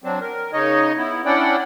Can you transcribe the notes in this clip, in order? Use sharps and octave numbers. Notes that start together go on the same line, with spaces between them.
F#3 C4 D4
A#4
C#3 D#4 C#5 D#5
B3 E4
C#4 D4 E4 D5 F#5 G5